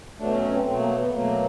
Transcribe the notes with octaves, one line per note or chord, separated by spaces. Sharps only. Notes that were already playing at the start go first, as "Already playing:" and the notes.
B2 F#3 A3 D4
C#4
C#4
C4
B2 F#3 A3 C4
A#3
B3
B3
B2 F#3 A3 A#3